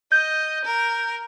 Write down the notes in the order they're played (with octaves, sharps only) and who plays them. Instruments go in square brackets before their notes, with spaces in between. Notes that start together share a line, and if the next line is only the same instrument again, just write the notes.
[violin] D#5 [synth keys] G6
[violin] A#4